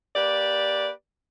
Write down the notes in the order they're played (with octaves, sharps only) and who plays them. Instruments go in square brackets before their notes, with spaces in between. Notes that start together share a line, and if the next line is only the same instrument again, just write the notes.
[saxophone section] A#3 G4 B4 D5